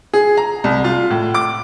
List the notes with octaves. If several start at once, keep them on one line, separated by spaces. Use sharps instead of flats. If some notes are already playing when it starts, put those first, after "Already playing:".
G#4
A#5
C2
F4
A2
D6